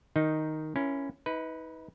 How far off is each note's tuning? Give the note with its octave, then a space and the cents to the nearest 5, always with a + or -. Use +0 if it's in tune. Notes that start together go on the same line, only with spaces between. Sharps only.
D#3 +0 D#4 +0
C#4 +0 E4 +20 A#4 +20
D#4 +40 B4 +0